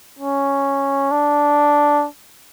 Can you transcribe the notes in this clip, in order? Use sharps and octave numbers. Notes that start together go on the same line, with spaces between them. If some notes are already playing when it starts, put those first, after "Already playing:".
C#4
D4